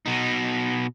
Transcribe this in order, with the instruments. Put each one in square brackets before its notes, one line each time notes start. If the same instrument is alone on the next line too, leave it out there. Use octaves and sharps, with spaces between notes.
[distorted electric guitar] B2 D#4